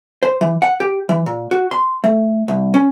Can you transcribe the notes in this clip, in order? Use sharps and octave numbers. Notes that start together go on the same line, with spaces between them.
C5
E3
F#5
G4
E3
A#2
F#4
C6
A3
C2
C#4